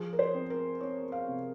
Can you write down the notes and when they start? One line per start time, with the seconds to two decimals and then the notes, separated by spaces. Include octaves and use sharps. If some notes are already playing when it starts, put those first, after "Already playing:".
Already playing: F3 G#4
0.13 A#4
0.19 C5
0.34 C4
0.50 A#4
0.81 C4 C#5
1.12 F5
1.28 C3